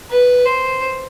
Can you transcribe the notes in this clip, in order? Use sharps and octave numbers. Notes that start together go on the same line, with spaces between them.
B4
C5